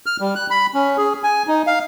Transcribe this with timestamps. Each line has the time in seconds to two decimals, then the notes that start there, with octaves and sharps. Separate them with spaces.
0.06 F6
0.20 G3
0.35 F#6
0.50 B5
0.74 C#4
0.97 G#4
1.24 G#5
1.47 D#4
1.67 F5